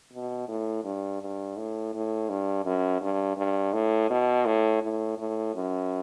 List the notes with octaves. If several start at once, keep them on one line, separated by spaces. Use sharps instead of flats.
B2
A2
G2
G2
A2
A2
G2
F#2
G2
G2
A2
B2
A2
A2
A2
F#2